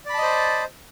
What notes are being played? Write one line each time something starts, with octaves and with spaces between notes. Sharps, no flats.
C5 D5 D#5 A5 B5